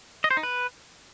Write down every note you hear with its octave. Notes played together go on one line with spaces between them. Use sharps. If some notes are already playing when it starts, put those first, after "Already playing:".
D#5
C5
D#4
B4